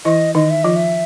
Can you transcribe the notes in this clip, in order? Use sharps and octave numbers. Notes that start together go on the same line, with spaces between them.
E3 E4 D#5
D#3 D#4 D#5
E5
F3 F4 D#5
E5